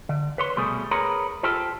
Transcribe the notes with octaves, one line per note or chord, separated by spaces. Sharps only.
D3
B4 C#5 C6
C2 B2 G3 A3 G#4
G#4 A#4 B4 C#5 A#5
F4 G4 A4 C5